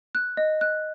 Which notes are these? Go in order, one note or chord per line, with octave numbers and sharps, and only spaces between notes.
F#6
D#5
F#6